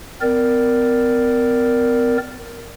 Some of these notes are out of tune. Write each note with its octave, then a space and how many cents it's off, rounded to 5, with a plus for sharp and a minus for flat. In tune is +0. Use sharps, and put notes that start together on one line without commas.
C4 -45 A#4 +0 D5 +0